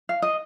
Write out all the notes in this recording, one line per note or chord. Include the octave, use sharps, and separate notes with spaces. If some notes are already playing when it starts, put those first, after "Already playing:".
F5
D#5